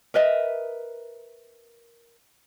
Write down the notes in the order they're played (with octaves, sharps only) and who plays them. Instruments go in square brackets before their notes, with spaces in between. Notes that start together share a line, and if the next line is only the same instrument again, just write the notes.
[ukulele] A#4 B4 D#5 E5